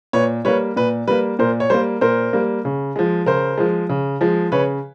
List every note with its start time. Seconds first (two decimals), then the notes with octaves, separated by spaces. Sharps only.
0.13 A#2 B4 C#5
0.45 G3 A#3 B4 C#5
0.76 A#2 B4
1.07 G3 A#3 B4
1.39 A#2 A#4 C5
1.60 C#5
1.70 G3 A#3 A#4 C5
2.01 A#2 A#4 C5
2.33 G3 A#3
2.65 C#3
2.96 F3 G#3
3.26 C#3 A#4 C5
3.58 F3 G#3
3.89 C#3
4.21 F3 G#3
4.52 C#3 B4 C#5